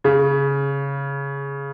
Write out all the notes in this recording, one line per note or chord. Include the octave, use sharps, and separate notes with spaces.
C#3